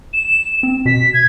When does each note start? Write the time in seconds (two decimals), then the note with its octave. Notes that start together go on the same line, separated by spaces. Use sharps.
0.13 E7
0.63 C4
0.86 B2 B6
1.13 G#6